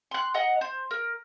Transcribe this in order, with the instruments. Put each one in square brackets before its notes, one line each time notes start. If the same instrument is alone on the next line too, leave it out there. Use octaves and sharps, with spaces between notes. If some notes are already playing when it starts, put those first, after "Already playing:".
[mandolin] C6 F#6
D#5 F#5 A#5
C5
A#4